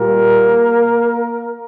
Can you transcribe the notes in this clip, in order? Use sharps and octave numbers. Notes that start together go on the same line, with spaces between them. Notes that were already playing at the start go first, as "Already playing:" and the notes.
Already playing: A#2 G3 A#3 A#4